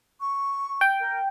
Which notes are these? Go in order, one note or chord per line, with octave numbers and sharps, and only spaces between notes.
C#6
G5
A#4